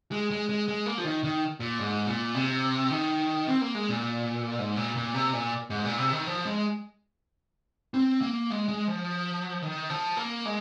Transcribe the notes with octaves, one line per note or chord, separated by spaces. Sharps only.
G#3
G#3
G#3
G#3
A#3
F3
D#3
D#3
A#2
G#2
A#2
C3
D#3
C4
A#3
G#3
A#2
G#2
A#2
A#2
C3
A#2
G#2
A#2
C3
D#3
F3
G#3
C4
A#3
G#3
G#3
F3
D#3
F3
A#3
G#3